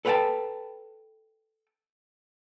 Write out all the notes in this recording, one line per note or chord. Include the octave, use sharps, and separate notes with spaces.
A4 B4 C#5 F#5 G5 A5